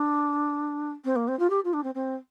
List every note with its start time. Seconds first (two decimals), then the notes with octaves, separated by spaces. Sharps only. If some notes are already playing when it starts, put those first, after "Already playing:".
Already playing: D4
1.04 C4
1.15 A#3
1.27 C4
1.39 F4
1.50 G4
1.64 F4
1.73 D4
1.83 C4
1.94 C4